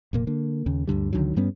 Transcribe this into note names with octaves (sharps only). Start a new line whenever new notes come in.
F1 A#2 A#3
D3 A#3
D#2 C#3
D2 G2 D3 G3
C#2 D3 D#3 F#3
G2 G3 B3 C#4